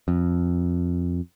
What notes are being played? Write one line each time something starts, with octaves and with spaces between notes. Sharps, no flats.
F2